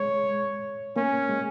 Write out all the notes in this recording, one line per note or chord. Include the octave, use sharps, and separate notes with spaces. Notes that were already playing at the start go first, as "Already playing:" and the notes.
Already playing: G#3 C#5
A#3 C#4
G#3